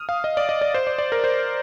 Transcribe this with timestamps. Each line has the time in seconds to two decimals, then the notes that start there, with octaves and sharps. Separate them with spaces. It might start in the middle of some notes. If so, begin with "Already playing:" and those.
Already playing: D#6 F6
0.09 F5
0.24 D#5
0.37 D5
0.49 D#5
0.61 D5
0.74 C5
0.87 D5
0.98 D5
1.12 A#4
1.24 C5